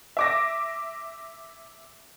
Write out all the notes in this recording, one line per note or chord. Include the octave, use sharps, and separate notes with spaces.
E5 D6 A#6